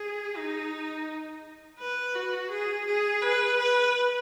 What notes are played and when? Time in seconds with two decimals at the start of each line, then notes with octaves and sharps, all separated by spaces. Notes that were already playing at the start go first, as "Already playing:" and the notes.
Already playing: G#4
0.36 D#4
1.79 B4
2.15 F#4
2.51 G#4
2.86 G#4
3.22 B4
3.57 B4